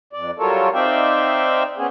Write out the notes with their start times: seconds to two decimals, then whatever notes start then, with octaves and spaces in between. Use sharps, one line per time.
0.13 F2 D5
0.39 F#3 G3 F4 A4 A#4 C#5
0.74 C4 D#4 D5 E5 F5 G5
1.77 B3 C#4 G#4